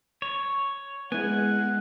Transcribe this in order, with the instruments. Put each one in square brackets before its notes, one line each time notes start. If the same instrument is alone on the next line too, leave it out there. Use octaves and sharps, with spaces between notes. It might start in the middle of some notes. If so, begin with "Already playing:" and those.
[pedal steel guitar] C#5
[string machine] G#3 [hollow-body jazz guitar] B3 E4 [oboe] F#5 [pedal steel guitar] G#5